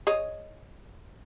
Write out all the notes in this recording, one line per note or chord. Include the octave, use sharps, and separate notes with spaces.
G#4 C#5 D#5